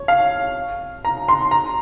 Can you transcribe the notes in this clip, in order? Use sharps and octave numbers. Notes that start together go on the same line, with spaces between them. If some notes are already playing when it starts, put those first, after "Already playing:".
Already playing: C#5
F5
A#5
C6
A#5